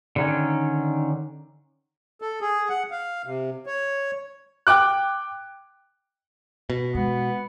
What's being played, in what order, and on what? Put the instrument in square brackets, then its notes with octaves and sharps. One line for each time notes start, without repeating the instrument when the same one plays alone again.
[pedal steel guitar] D3 D#3 C#4
[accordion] A4
G#4
F#5
F5
C3
C#5
[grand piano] G5 D6 F#6
[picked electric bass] B2
[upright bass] G#3 [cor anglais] B3